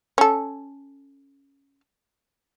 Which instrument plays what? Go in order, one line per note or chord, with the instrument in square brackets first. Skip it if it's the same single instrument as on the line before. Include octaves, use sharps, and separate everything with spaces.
[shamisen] C#4 A4